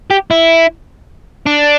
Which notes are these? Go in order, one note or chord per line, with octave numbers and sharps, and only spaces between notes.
G4
E4
D4